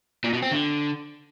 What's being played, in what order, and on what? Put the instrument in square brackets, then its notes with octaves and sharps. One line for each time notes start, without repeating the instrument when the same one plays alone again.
[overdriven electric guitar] A#2
B2
C4
D3